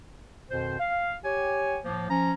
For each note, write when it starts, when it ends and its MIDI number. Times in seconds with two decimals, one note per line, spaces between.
0.50 0.76 41
0.50 0.76 47
0.50 0.76 51
0.50 0.76 72
0.79 1.13 77
1.24 1.78 67
1.24 1.78 73
1.24 1.78 80
1.84 2.09 45
1.84 2.09 53
1.84 2.09 58
2.09 2.33 53
2.09 2.33 61
2.09 2.33 82